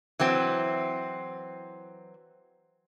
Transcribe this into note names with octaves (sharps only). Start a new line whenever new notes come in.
E3 F#3 C4